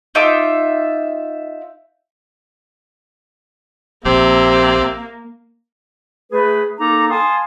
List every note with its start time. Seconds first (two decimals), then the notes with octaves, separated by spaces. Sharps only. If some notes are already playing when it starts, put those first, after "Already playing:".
0.15 D#4 F4 E5 D6
4.05 A#1 C3 A#3 E5
6.31 A3 G#4 B4
6.79 A#3 D#4 A4 A#4 A#5 D6
7.09 F5 G#5 A5 C6 D#6